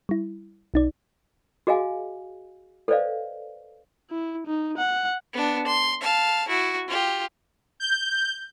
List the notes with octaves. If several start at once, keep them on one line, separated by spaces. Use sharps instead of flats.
G3 E4
B1 D#4 D5
F#4 G#4 D#5 F5 G#5
A4 B4 C5 D5 D#5 F5
E4
D#4
F#5
B3 D4
C6
F5 A5
E4 F#4
F4 G4
G6